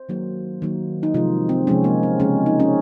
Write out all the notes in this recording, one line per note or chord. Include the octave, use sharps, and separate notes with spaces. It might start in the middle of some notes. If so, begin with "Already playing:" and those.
Already playing: C5
D#3 F#3 A#3
D#3 F#3 A#3
D#4
C3 F3 G#3 F4
C4
C3 F3 G#3 C#4
A#3
C4
C#3 G#3 C#4
D#4
C#4